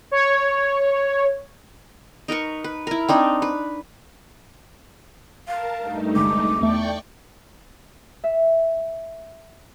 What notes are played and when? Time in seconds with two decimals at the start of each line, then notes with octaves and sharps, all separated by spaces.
0.11 C#5
2.28 D#4 A#4 B4 C#6
2.64 B4
2.87 E4 A#4
3.09 C4 D4 D#4
3.42 B4
5.47 A#4 F5 A5
5.78 G2 A3 D#4
6.16 G1 C2 G#3 D6
6.61 E2 A3 D5 G5 C#6
8.24 E5